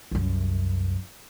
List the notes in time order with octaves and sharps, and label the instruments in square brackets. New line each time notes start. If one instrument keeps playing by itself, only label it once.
[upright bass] C2 F#2